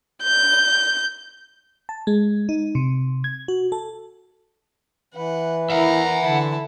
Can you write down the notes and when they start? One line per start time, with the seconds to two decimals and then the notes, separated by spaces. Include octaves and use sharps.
0.23 G6
1.89 A5
2.07 G#3
2.49 D#4
2.75 C3
3.24 G#6
3.48 F#4
3.72 A4
5.15 E3 B4 F#5
5.70 E4 A#4 E5 F#5 A#5
6.22 D3 E4 A5